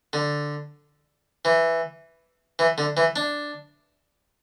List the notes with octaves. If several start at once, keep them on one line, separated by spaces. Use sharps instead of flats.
D3
E3
E3
D3
E3
D4